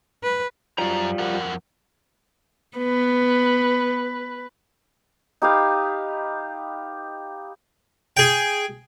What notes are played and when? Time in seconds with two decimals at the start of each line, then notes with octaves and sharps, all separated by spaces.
0.23 B4
0.78 F#2 F3 G3 A#5
1.19 F2 A#4 F#5
2.77 B3 B4
5.42 D#4 G4 B4 F5
8.17 G#4 G5